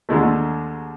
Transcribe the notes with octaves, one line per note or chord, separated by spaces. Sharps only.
D#2 D3 G#3 A3